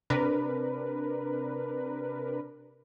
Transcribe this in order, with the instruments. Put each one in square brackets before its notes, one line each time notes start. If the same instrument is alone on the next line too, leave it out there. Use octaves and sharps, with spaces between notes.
[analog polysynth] C3 D4 A#4 B4